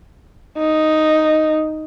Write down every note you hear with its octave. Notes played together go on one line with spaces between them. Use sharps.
D#4